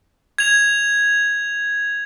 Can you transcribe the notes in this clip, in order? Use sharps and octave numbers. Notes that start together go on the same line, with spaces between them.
G#6 F7